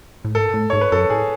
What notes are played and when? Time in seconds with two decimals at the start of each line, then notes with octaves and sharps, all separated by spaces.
0.25 A2
0.35 G#2 A4
0.54 A2
0.70 G#2 C#5
0.81 B4
0.92 F#2 A4
1.10 A2 G#4